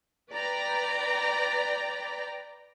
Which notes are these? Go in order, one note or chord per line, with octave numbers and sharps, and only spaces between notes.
B4 D5 G5 A#5